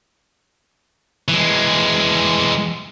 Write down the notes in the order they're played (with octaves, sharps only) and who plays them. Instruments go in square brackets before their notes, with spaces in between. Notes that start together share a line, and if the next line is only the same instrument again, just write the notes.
[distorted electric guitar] E3 G#3